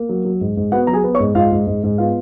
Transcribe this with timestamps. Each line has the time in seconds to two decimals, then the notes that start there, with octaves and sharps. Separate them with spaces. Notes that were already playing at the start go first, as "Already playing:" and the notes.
Already playing: A#3
0.09 F#3
0.25 F#3
0.41 G#2
0.57 G#2
0.72 B3 F#4 F#5
0.87 F#3 A#5
0.93 G#4 G#5
1.04 B3
1.15 C#5 C#6
1.20 G#2
1.35 G#2 F4 F5
1.52 G#2
1.67 G#2
1.83 G#2
1.98 B3 F4 F5